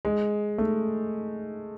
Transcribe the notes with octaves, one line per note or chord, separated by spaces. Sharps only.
G#3
A3